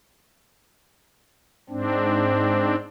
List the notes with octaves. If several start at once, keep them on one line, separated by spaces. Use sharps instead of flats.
G#2 C4 D4